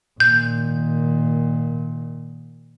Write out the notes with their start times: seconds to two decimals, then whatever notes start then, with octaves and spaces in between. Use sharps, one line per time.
0.20 A#2 D#3 G6